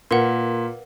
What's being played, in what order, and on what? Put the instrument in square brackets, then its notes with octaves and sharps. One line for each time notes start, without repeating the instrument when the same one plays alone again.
[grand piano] A#2 [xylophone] A#4 B4 F#5